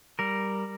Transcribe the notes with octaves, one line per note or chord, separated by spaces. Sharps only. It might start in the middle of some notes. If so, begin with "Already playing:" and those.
G3 A#4